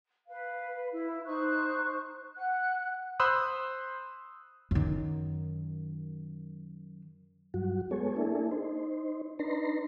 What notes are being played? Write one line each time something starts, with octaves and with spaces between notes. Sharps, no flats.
B4 F5
E4
D#4 C5 C#6 F#6
F#5 F#6
C5 B5 C6 D#6 E6 F#6
F#2 D#3
G2 F#3 F#4
G#3 B3 G#4 A4 C#5
A#3 D4 E4 G#4 A4
D#4 C5
D4 D#4 B4 A#5 C6